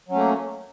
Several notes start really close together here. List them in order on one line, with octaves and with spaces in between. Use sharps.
F#3 C#4 A3 A#3